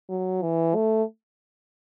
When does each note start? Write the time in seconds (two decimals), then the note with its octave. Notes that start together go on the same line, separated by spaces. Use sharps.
0.10 F#3
0.42 E3
0.75 A3